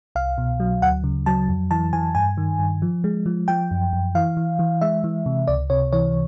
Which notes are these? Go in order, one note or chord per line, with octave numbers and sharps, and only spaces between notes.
C2 F5
B2
F#3
D2 F#5
C#3
F#3 A5
F2
E3 A5
E3 G#5
G2 G#5
D#3
G2
F3
G#3
F3
F3 G5
F#2
F#2
E3 F5
E3
E3
G#3 E5
E3
C3
C#2 D5
C3 C#5
E3 C#5